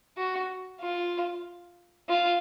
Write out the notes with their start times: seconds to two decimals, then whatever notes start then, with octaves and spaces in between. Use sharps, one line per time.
0.17 F#4
0.81 F4
2.09 F4